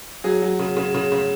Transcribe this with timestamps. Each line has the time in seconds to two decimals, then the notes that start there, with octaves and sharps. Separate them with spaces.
0.24 F#3 G#4
0.42 F#3
0.59 C#3
0.77 C#3
0.94 C#3
1.12 C#3